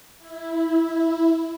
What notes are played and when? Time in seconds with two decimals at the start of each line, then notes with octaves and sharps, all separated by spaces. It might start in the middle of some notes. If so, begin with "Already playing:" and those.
0.18 E4